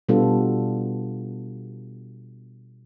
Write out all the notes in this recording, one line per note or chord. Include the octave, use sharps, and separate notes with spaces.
B2 G3 B3 D4 F4 A4